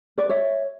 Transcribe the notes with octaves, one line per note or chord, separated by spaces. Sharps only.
B4 D5
C#5 E5